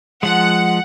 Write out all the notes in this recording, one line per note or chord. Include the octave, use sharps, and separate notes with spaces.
F3 G#3 F#5